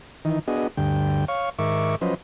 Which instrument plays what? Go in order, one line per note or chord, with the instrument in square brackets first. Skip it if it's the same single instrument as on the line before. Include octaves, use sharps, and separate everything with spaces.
[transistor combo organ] D#3 E3 D#4
B3 D4 F#4 G#4 D#5
D2 G2 D3 G5
C#5 F5 C#6
G#2 D#3 A#4 E5 C#6 D6
F3 F#3 C#4 B4 C5 D#5